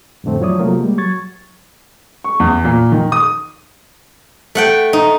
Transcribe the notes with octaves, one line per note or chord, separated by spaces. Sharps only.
F2 A2 D3 A3 C4
F3 F#3 E4 C#5 D5 D#6
C3 F#3 A3 A#3 F4 A#4
G3 G#3 A#3
F#3 C#6 G#6 A6
C#6
E2
A#2
D#3
D#6
A3 F#5 G5
D#4